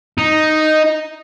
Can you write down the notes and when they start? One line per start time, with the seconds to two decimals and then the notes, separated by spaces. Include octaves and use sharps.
0.18 D#4